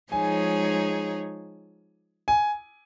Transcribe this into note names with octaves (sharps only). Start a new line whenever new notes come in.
F3 G#3 D#4 G#4 C#5 G#5
G#5